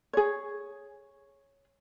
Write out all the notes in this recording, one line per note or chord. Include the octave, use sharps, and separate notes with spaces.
G#4 C#5